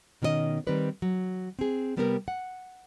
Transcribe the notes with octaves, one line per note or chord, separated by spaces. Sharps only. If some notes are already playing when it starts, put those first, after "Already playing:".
B2 D#3 C#4 A#4 D#5
D#3 G3 C4 D#4 B4 D5
F#3
C4 G#4
C3 G3 B3 G4 G#4 A#4
F#5